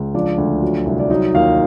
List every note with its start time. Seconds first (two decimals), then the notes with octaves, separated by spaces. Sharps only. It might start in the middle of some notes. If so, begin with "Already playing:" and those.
Already playing: C#2
0.15 F3 D4 D5
0.38 D2
0.62 F#3
0.86 C2
0.99 D5
1.10 F#3 D#4 D#5
1.34 D#2 F4 F5